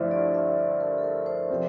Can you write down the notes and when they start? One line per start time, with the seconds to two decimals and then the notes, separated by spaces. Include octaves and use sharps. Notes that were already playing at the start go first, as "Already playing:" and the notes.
Already playing: G2 D3 F3 A3 E4 C5 D5 E5
0.11 D5
0.34 E5
0.58 D5
0.80 A#4
0.98 A4
1.04 A#4
1.26 C5
1.50 C3 F3 C4